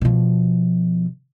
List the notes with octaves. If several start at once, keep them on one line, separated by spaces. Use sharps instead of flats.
B2 F3